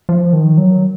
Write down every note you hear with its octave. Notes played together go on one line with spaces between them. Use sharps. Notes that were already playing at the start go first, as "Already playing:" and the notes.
F3
D#3
F#3